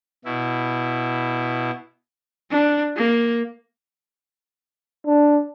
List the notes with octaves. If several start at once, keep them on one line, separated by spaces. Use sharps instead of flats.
B2 E4
D4
A#3
D4